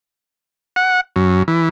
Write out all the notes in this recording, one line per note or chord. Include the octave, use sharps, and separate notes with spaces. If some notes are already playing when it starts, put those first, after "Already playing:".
F#5
F#2
E3